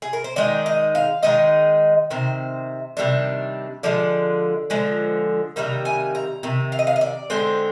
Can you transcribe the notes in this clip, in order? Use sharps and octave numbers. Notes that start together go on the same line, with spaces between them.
G#4
A#4
C5
D#3 G#3 D#4 D5
D#5
F5
D#3 G#3 D#4 D#5
C3 D#3 C5
C3 D#3 G3 D4
D3 F3 G#3 D5
D3 F3 G#3
C3 D#3 G3 A#3 A#5
G#5
A#5
C3 D#3
F5
D#5
F5
D#5
D5
D3 G#3 C4 C5